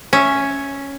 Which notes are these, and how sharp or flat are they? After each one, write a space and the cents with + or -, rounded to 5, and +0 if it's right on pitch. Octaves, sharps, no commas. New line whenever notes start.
C#4 +0 E5 +0